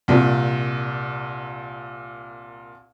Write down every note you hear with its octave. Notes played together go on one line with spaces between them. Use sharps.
C2 A#2